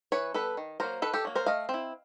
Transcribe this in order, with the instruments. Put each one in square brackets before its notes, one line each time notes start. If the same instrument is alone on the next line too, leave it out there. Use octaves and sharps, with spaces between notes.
[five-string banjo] E3 B4 C#5
G3 B3 A4 B4
D#3
F#3 A#3 A#4 C5
D#3 A4 B4
G4 A4
F#3 A#3
A#4 C5
A3 D#5 F5
C4
E4